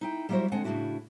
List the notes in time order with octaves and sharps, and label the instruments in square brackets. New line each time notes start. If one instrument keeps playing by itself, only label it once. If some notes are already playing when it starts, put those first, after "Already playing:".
[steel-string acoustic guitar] D#4 E4 G5
F#3 G3 A#3 E4 F#4 C5
D3 G#3 C4 F#5 G#5 A5
A2 C#3 F#3 D4 E4 F#4